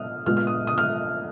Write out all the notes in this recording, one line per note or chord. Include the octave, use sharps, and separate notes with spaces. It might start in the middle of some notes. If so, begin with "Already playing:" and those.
Already playing: A#2 B3 D#6 F6
A#2 G#3 B3 F4 F6
F6
D#6
D#6
F6